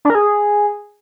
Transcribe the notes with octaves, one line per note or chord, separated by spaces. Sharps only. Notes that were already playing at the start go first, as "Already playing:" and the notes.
D4
A#4
G#4